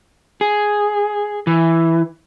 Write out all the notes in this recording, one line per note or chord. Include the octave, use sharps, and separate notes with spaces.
G#4
E3